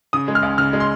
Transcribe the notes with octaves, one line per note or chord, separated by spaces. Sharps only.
C#3 D#6
G#3
F6
C#2
C#3 F6
G#3
C6